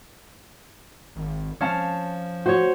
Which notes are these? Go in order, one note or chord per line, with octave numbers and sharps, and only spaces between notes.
G#1
F3 C#4 F5 A5
F#4 C5 C#5